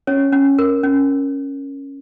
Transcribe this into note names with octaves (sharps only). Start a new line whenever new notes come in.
C#4 C#5
C#4
A#4
C#4